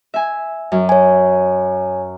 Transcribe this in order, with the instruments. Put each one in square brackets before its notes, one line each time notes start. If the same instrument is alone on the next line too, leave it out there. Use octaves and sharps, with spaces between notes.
[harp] E5 G#5
F#2
[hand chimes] C#5 G#5